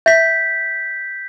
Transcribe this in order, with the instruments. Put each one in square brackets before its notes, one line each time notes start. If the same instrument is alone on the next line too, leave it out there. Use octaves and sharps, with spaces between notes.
[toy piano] E5 [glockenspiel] G6 B6